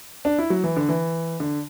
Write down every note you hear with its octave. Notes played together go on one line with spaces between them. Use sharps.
D4
E4
F#3
E3
D3
E3
D3